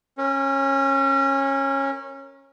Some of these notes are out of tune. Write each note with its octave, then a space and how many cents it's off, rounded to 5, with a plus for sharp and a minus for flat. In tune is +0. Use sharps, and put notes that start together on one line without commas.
C#4 -20 A#4 +0